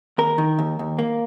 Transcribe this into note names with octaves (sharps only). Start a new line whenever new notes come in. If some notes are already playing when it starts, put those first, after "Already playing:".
D#2 A#4
D#3
D#2
D#2
A#3